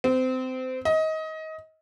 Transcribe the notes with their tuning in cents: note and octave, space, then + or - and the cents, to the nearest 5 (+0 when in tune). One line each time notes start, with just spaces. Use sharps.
C4 -25
D#5 +25